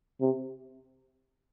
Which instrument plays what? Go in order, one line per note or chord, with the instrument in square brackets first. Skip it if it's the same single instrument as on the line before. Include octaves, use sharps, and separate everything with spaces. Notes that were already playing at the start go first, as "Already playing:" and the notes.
[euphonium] C3